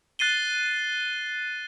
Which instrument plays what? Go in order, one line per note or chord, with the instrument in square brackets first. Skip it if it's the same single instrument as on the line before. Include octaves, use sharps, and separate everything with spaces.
[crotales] F#6 A6 C7 D#7 G7